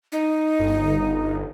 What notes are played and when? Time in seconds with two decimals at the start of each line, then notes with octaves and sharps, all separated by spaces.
0.12 D#4
0.59 G1